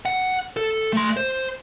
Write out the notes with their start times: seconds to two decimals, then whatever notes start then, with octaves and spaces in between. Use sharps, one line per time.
0.05 F#5
0.57 A4
0.93 A3 C6
1.17 C5